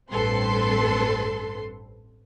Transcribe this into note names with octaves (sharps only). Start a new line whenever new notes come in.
A1 G2 C4 A4 B4 C6